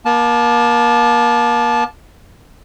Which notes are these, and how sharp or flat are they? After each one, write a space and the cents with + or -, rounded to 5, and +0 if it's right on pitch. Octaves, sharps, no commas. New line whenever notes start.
A#3 +35 A5 -20